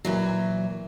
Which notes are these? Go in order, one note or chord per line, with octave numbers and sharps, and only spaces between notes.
A#2 E3 F#3